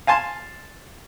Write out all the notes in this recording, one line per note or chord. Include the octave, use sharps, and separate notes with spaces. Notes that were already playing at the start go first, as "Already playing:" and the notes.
F5 G#5 A5 C6